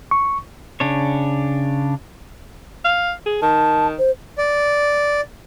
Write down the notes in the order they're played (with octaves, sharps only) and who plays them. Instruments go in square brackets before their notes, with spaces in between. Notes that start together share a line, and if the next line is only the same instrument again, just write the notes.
[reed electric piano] C#6
[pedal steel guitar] C#3 D4 C#5
[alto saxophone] F5
G#4
[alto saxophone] D#3 [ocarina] A5
[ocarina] C5
[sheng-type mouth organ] D5